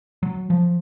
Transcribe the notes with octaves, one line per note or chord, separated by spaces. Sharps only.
F#3
F3